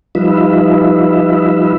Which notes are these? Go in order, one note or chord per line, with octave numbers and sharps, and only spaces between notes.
F3 G3 D#4 F4 B4 E5